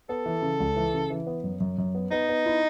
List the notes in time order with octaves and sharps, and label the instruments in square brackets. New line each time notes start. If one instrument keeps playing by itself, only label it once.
[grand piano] B3 [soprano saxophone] A4
[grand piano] E3
C#3
C#2
E3
C#3
E3
B3
F#2
F#2
F#2
B3
[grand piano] B3 [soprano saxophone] D#4
[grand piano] B3
E4